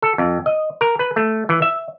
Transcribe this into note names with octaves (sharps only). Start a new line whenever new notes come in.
A4
F2
D#5
A#4
B4
A3
E3
E5